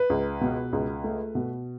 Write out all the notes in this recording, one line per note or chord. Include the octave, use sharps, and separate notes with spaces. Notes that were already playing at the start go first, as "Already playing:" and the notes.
Already playing: B4
C#2
B2
C#2
A3
B2